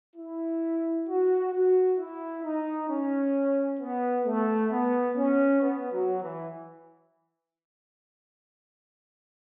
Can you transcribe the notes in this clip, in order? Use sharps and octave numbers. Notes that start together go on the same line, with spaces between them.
E4
F#4
F#4
E4
D#4
C#4
B3
A3
B3
C#4
B3
F#3
E3